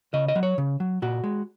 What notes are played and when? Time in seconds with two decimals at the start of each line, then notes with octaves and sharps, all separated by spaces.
0.13 C#3 D#5
0.28 D#5
0.35 F#3
0.43 C#5
0.58 C#3
0.80 F#3
1.02 A#2 F#4
1.24 G#3